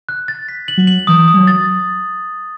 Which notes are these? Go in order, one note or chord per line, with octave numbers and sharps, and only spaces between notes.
F#6
A6
B6
F#7
F#3
F#7
E3 D#6
D#6
G3
F#3
A6